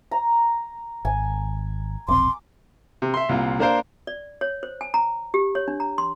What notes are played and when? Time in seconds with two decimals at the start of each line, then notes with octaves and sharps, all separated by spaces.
0.11 A#5
1.05 G#1 G#5
2.08 E1 A#1 C4 C6 D6
3.02 C3
3.14 E5 C6
3.29 C2 A#2 F4
3.59 A#3 D4 A#4 C5 F5
4.07 D5
4.41 C#5
4.63 C5
4.81 G#5
4.94 A#5
5.34 G4
5.55 C#5
5.68 D4
5.80 A#5
5.98 C6